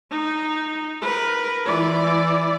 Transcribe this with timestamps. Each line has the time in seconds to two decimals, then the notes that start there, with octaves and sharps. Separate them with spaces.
0.11 D#4
1.01 A#4 B4
1.66 E3 D5